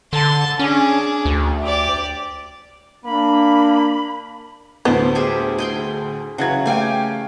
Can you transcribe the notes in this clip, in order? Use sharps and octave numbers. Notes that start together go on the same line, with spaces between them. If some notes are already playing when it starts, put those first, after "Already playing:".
D3 A5 C6
C#4 D4 G#4
D2
G4 D5
A#3 D4 B5
D2 A2 B3 C5
G4 G#4 E5
G#4 G5 C6
C#3 E3 F#3 F#5 G#6
A3 G4 F5 G5 G#5 C#6